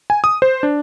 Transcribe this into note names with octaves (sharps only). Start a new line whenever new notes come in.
G#5
D#6
C5
D4